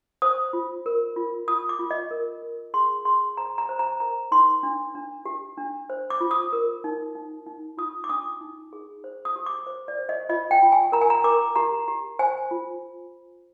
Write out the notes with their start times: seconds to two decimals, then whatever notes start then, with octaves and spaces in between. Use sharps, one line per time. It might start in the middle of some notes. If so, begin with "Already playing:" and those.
0.22 C5 D#6
0.53 F4
0.86 A#4
1.16 F4
1.48 F4 D#6
1.69 D6
1.79 F4
1.91 D#5
2.11 A#4
2.42 A#4
2.74 G#4 C6
3.05 G#4 C6
3.37 C5 A#5
3.58 A#5
3.69 C5
3.79 A#5
4.00 A#4 A#5
4.31 D#4 C6
4.63 D4
4.95 D4
5.25 G4
5.57 D4
5.90 C5
6.10 D6
6.21 F4
6.31 D#6
6.53 A#4
6.84 D#4
7.15 D#4
7.46 D#4
7.77 F4 D#6
8.04 D6
8.09 D4 D#6
8.41 D#4
8.73 G#4
9.04 C5
9.25 D#6
9.36 G4
9.46 D6
9.67 C5
9.88 D5
9.99 C5
10.09 D#5
10.29 F4 D#5
10.51 G5
10.62 F4
10.72 G#5
10.92 A#4 A#5
11.01 G#5
11.10 A#5
11.24 A#4 D6
11.56 G4 A#5
11.88 G4
12.19 C5 G#5
12.51 F4